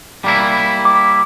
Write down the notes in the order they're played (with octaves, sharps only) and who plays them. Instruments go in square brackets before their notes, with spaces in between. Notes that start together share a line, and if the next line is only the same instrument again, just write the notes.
[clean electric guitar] G3 A#3 E4
[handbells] D6